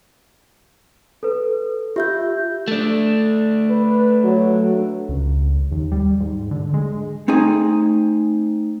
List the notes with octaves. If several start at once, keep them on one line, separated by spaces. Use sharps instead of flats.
A4 B4
F4 G4 E5 G6
A3 D4
B4
F#3
C#2
D#2
G3
G#2
D3
G#3
A3 C4 D#4 G#4 G#5